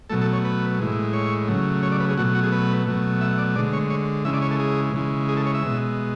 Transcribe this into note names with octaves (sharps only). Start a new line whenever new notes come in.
B2 F#3 A3 A4
A4
C#5
B4
A2 E3 G#3
C#5
C#3 F#3 A3
C#5
D5
B4
G#4
B2 F#3 A3 F#4
F#4
G#4
B4
B2 F#3 A3
E5
D5
D3 G#3 D5
C#5
C#5
C#3 E3 G#3 E5
D5
C#5
A4
G#4
C#3 E3 G#3
G#4
A4
C#5
E5
B2 G#3